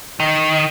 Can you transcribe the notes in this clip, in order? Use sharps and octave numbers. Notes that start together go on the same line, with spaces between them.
D#3